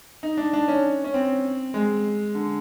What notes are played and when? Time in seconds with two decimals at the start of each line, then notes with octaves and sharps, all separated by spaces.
0.23 D#4
0.37 D4
0.53 D4
0.68 C#4
1.04 C#4
1.14 C4
1.74 G#3
2.35 D3